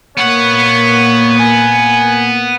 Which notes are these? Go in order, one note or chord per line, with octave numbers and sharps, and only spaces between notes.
A#2 A#3 B3 C#5 F#5
G#5